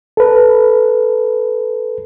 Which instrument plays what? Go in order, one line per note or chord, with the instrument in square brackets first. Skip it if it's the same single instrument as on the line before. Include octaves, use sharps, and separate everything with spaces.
[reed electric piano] A4 B4